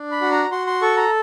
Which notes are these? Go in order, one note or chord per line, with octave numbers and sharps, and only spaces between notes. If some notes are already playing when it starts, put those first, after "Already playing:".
Already playing: D4
B5
F#4
A#5
F#4 C6
C6
A4 C#6
A#5